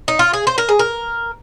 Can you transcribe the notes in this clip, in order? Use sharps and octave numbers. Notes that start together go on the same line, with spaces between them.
D#4
F4
G#4
C5
A#4
G#4
A#4